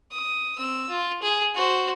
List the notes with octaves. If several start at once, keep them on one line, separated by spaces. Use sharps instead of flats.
D#6
C4 E6
F4
G#4
F#4 C5